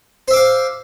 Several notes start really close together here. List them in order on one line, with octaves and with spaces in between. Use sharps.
C5 E5 D6 F5